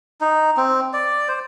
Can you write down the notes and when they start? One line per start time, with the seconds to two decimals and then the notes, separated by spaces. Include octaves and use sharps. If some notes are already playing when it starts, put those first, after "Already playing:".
0.21 D#4
0.57 C4
0.93 D5
1.28 C5